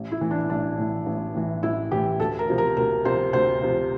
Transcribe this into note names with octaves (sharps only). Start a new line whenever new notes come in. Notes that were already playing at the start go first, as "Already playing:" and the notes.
Already playing: A1
E4
A2 E3
D4
A1 D4
A2 E3
A1
A2 E3
A1 E4
A2 E3 G4
D2 A4
A#4
C3 F3
A#4
D2 A#4
C3 F3 C5
D2 C5
C3 F3